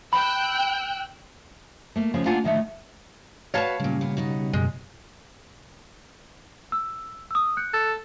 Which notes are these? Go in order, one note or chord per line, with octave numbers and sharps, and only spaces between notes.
G5 B5 E6 F#6
A3 A#3
C#3 F3 G#3
A#3 D4 F4 F#5 G#5
A2 D3 D#3 F3 F#3 A3
F#4 B4 C#5 F5 F#5 A5
F#2 A#2 C#3 G3
A#2 B3
B2 D#4 F#5
F#2 B2 G#3
E6
D#6 E6
F#6 G6 C#7
A4